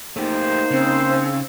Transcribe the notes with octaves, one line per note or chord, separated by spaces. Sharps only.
A3 A#3 D#4 G4 C5
C#3 C4